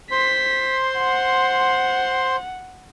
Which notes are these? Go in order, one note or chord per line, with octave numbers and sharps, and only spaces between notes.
C5 C6 B6
F#5